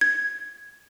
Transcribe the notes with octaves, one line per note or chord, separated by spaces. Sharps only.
G#6